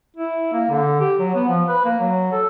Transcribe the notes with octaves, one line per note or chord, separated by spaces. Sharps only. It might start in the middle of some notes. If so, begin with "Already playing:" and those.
E4
A#3
D3
G4
F#3
B3
F3
B4
A#3
F#3
A4